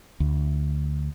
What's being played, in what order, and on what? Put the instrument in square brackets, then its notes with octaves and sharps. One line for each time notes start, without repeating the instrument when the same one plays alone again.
[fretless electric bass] D2